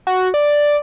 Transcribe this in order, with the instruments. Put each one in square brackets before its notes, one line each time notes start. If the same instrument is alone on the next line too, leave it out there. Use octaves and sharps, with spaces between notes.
[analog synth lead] F#4
D5